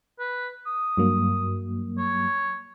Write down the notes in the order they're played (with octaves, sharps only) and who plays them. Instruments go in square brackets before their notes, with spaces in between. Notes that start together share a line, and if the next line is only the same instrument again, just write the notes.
[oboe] B4
D#6
[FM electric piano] G2 F#3 A#3
[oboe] C#5